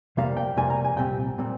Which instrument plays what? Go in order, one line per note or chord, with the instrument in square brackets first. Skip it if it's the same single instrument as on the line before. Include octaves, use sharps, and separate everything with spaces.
[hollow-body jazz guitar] F2 C3 G3 A#3 F5
G5
F2 C3 G3 A#3 G#5
A#5
G#5
C2 A#2 G3 C4 G5
A#2 G3 C4